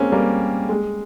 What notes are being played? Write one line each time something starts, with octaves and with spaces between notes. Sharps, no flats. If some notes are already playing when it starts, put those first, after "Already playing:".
Already playing: G#3 A#3 C4 C#4
G3 A#3
G#3